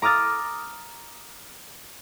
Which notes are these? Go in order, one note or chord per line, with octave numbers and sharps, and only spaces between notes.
A#5 D6 D#6 F6 A6